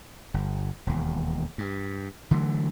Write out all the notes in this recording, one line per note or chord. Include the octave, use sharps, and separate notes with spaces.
G1
E1 D#2
G2
D3 E3 F#3 A3